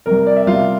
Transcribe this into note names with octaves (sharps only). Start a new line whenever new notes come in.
C3 G3 A#4
D5
E5
C3 G3 F4